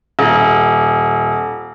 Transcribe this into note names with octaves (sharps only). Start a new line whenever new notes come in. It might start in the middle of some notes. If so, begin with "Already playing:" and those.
D#1